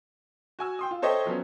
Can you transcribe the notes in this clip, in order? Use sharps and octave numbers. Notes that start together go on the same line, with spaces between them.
F#4 G#5 E6
G5 C6 D#6
F4
A4 C5 C#5 D#5 E5 G5
F3 F#3 B3 C#4